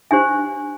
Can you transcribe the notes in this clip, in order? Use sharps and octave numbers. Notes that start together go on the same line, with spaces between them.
D4 G4 C5 G#5